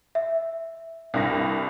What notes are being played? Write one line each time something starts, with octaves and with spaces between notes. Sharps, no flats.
E5
C2 G2 A#6